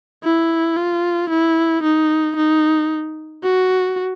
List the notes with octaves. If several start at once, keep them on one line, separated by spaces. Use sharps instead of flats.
E4
F4
E4
D#4
D#4
F#4